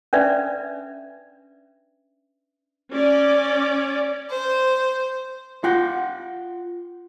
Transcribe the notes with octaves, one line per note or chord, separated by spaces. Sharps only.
C#4 D4 B4 D5 E5
C#4 D5
C5
F4 F#5 G5